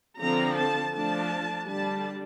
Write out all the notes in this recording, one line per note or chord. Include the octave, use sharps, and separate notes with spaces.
D3 F3 C4 A#5
A5
F3 A3 D4 A5
D3 G3 D4 A5